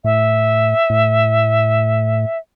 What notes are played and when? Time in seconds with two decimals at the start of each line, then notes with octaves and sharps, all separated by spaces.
0.04 A2 E5
0.90 A2